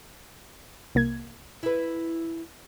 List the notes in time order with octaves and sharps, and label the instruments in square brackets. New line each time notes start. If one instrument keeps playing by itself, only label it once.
[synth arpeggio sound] C2 A#3 G#6
[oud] E4 B4